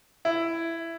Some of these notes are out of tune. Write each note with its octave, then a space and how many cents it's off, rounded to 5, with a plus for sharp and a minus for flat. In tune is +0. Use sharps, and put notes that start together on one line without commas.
E4 +10